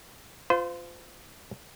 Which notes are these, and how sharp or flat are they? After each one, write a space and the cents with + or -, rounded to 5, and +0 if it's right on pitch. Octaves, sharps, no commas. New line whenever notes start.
F4 +0 C5 -35